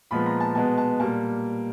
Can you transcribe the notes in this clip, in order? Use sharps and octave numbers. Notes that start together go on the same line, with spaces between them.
A#2 F3 G#3 B3 B5
A#5
A5
B2 G#3 B3 A5
A5
A#2 G3 A#3 A5